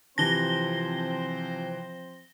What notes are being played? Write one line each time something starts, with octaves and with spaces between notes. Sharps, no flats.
C3 E3 F3 C4 C5 A5 A#6 G7